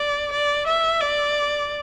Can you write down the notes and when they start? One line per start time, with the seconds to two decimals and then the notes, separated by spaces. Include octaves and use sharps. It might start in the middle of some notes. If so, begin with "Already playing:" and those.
Already playing: D5
0.32 D5
0.67 E5
1.01 D5